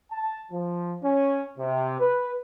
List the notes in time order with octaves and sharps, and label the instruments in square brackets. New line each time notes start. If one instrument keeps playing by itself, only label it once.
[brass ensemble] A5
F3
C#4
C3
B4